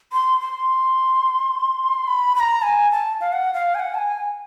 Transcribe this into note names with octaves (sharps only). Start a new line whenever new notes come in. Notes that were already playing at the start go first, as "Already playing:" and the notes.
C6
C6
B5
B5
A#5
G#5
A5
F5
F#5
F5
G#5
F#5
A5
G#5